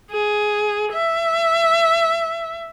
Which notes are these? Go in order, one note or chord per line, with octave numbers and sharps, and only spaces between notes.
G#4
E5